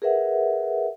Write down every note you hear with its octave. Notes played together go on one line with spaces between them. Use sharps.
G#4 A#4 B4 E5 F#5